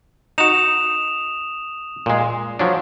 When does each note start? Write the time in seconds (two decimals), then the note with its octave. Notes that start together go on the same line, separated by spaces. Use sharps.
0.38 D#4 F#4 D#6 E7 F7
2.06 A#2 G#3
2.59 F3 F#3 D4